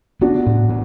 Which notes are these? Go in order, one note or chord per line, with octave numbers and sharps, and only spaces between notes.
B3 D4 F#4
A2
B3